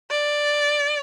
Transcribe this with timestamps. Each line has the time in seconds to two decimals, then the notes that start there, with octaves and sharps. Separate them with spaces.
0.10 D5